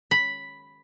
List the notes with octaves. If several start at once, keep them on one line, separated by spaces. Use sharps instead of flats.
B5